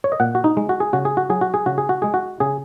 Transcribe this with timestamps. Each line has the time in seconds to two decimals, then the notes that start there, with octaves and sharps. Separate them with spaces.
0.04 C#5
0.12 D#5
0.20 A#2 F#5
0.35 F#4
0.44 D#4
0.57 G#3
0.69 F#4
0.80 G#4
0.93 C#3 F#4
1.05 G#4
1.17 F#4
1.30 F#3 G#4
1.41 F#4
1.54 G#4
1.66 C#3 F#4
1.78 G#4
1.89 F#4
2.02 G#3 G#4
2.14 F#4
2.40 C#3 G#4